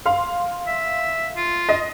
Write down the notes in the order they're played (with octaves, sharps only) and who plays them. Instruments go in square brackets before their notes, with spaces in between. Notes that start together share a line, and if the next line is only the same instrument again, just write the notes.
[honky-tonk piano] F5 C6
[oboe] E5
F4
[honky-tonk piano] D#5